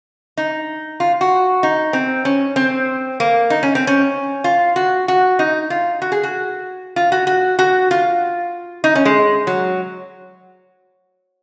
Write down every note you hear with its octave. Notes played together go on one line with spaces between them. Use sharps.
D#4
F4
F#4
D#4
C4
C#4
C4
A#3
D#4
C#4
C4
C#4
F4
F#4
F#4
D#4
F4
F#4
G#4
F#4
F4
F#4
F#4
F#4
F4
D#4
C#4
G#3
F#3